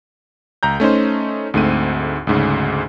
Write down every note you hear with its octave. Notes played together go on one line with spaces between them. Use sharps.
C#2 A#5 G6
A3 C#4 D#4 C5
D2 G#2 A3 C4 D#7
D2 G#2 C#3